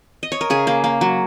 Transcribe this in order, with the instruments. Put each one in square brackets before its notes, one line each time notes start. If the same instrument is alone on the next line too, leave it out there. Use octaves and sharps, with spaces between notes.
[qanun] D#5
C#5
A#4
C#3 G#4
A#3
A#3
F#3